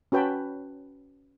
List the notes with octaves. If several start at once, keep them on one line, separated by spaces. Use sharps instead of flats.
C#4 F#4 B4 G5 A5 B5